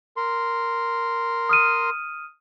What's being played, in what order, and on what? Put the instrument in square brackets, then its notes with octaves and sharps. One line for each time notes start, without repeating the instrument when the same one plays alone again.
[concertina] A#4 C6
[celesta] D#6 F6 D#7